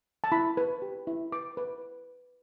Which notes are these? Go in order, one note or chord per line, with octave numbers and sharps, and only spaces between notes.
A5
E4 B5
B4
G4
E4
B4 D6
B4